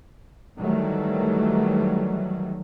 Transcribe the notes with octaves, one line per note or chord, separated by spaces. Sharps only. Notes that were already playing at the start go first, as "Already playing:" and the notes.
D#3 E3 F#3 G3 A3